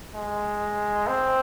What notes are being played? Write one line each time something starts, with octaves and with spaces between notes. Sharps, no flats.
G#3
C4